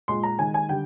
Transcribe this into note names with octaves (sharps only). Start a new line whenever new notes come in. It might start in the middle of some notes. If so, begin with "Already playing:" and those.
A#2 G#3 C6
A#5
D#3 G#3 G#5
G#5
D3 G3 G5